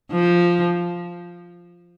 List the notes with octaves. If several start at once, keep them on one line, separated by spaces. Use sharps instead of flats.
F3